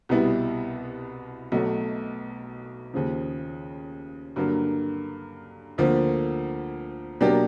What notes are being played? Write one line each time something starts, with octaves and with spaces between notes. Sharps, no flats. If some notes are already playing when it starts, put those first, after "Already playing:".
C2 B2 G3 B3 E4
B1 B2 F#3 A3
D#2 C#3 F3
G2 D3 F#3 A#3
D2 D3 F3 A#3
B2 F#3 A#3 D4 G4